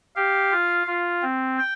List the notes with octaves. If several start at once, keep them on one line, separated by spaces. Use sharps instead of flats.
G4 F5
F4
F4
C4
G5